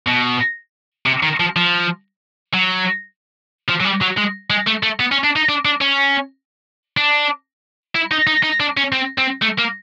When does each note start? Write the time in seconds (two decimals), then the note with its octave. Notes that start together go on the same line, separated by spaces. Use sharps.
0.08 B2
1.06 C3
1.23 D#3
1.40 F3
1.56 F3
2.54 F#3
3.68 F3
3.80 F#3
3.85 G3
4.02 F#3
4.18 G#3
4.50 G#3
4.67 A3
4.83 A3
5.00 B3
5.12 C#4
5.24 D4
5.36 D#4
5.49 D4
5.65 D4
5.81 C#4
6.97 D4
7.95 E4
8.11 D#4
8.27 D#4
8.43 D#4
8.60 D4
8.77 C#4
8.92 C4
9.18 C4
9.42 A3
9.58 A#3